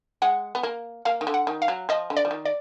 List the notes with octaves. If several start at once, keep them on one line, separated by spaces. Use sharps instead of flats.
G#3 F#5
B3
A#3
A#3 F5
D#3
D3
F#5
D#3
F5
F#3
F3 D#5
D3
D5
F3
D#3
D5